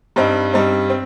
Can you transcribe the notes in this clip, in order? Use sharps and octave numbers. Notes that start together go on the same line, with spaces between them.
G2 G3 C4 D#4
G2 G3 C4 D#4
C4